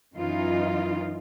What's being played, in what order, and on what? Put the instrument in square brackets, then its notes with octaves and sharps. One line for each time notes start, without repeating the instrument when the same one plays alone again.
[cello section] F#2 E3 D#4 F4